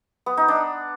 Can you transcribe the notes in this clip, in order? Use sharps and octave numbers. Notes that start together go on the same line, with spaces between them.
B3
D#4
D4